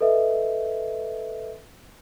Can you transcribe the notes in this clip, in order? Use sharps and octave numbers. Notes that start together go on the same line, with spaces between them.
A4 B4 D#5 E5